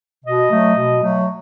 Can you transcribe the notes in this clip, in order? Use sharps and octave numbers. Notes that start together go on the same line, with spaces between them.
B2 D#5
F#3 A3
B2
F#3 A3